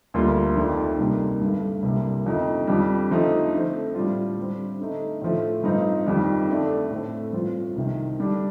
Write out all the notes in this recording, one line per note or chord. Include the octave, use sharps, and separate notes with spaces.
D2 D3 G3 A#3 F4
F2 D#3 A3 D4 F4
C2 C3 D#3 G3 A#3
G2 D3 A3
C2 C3 G3 A#3
F2 D3 A3 D#4
F2 D3 G3
D3 F3 A3 D#4
D3 A3 C4
A2 G3 D4 F4
D3 G3 C4
D3 A3 D#4
A2 F3 A3
G2 F3 C4 D#4
F2 D#3 G3
D3 A3 D4
A2 A3 C4
G2 F3 C4 F4
C2 C3 D#3
D3 G3 D4